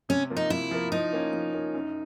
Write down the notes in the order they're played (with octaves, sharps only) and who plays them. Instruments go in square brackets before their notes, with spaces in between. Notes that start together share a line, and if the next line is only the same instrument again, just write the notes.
[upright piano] C3 [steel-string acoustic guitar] C#4
[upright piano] F3 A#3
[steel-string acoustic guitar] D#4
[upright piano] C3 [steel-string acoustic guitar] E4
[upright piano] F3 A#3
[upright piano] F3 [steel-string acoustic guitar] D#4
[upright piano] A#3 C#4
F3
A#3 C#4
F#2